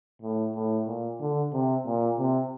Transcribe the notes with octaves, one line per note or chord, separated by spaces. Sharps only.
A2
A2
A#2
D3
C3
A#2
C3